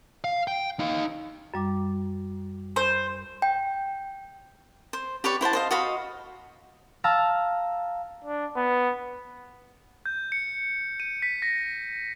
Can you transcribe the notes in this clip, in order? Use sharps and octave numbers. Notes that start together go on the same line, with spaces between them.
F5
G5
D#4 F5
F#2 G3 D6
C5
G5
C5
G4 B4 C#5 D5
E4 C5 F#5 A5
C5 D#5 F5
F#4 D#5 F5 B5
F5 A5 A#5 E6 F6
D4
B3
G6
C#7
D#7
B6
A#6